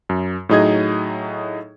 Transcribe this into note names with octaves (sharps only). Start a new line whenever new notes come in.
F#2
A2 F#3 D#4 G#4 D#5 G#6